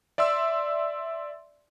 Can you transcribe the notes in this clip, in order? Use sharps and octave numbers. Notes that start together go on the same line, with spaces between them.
D5 E5 C6 E6